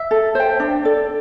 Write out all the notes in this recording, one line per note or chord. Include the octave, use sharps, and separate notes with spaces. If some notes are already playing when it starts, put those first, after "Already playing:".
Already playing: E5
A4
C5 G5
D4
A4 D5